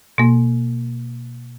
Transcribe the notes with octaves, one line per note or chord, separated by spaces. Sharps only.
B2 A#3